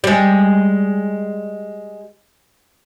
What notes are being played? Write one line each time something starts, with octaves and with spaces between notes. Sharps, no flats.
G3 G#3